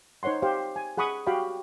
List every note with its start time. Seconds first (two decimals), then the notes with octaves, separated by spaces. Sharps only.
0.23 D#4 C5 C#5 F#5 C6
0.42 G4 C5 F5
0.76 G#5
0.97 G#4 F#5 B5 C#6 D#6
1.27 F#4 G4 F5 G5 B5